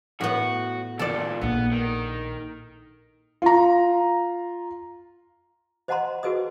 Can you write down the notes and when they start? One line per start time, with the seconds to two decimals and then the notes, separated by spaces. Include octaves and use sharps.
0.21 A2 B3 F#4
0.99 C#2 A#2 D#3 A4 D5
1.42 A#1 B3 D#4
1.72 D#3
3.42 F4 A#5
5.88 C5 D#5 F#5 A5 A#5 C6
6.23 F#4 G#4 B4 D#5 D#6